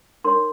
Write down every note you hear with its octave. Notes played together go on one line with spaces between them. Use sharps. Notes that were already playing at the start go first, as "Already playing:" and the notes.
D#4 A#4 C#5 C6